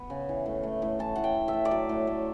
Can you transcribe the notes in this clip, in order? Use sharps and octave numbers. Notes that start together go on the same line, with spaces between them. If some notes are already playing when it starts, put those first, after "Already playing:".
Already playing: B3 B5
C#3
E3
A2
A3
A2
E3 A5
A2 F#5
G5
A3
E5
A2
D5
F#3 E5
A2
A3